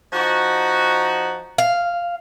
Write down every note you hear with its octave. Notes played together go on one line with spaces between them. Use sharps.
F3 D#4 F#4
F5